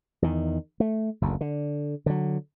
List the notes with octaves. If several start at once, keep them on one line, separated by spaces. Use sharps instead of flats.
E2 D#3
A3
F#1 D2
D3
D3 F#3